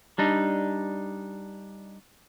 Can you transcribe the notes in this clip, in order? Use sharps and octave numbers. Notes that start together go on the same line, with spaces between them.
G3 D4 D#4